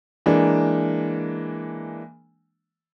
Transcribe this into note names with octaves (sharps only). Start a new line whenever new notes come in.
E3 G#3 A#3 D4